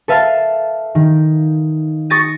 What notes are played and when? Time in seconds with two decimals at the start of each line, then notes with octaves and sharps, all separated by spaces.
0.08 A4 B4 E5 F5 A5
0.95 D#3
2.10 C#6 D#6 A6 A#6 D#7